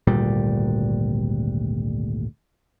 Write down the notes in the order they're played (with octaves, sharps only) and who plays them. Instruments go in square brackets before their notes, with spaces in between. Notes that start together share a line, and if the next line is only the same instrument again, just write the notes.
[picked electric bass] G#1 D2 A#2 G3